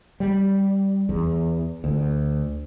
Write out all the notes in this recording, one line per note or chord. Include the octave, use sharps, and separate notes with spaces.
G3
E2
D2